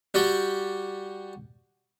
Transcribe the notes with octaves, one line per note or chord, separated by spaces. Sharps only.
G3 F#4 G4 D5 G5